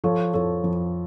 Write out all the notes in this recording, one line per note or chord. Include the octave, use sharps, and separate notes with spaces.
F3 A4 C#5
F2 A4 C#5
F2